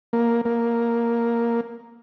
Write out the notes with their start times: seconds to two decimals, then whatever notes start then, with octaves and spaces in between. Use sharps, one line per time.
0.13 A#3
0.45 A#3